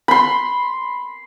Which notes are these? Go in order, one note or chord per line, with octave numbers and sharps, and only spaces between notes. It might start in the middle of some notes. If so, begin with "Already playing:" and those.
B5 C6